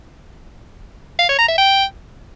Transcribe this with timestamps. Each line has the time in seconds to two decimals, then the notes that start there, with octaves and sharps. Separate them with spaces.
1.19 F5
1.29 C#5
1.38 A#5
1.48 E5
1.58 G5